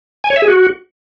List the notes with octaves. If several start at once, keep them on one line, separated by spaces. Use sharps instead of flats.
G#5
C#5
E5
G#4
F#4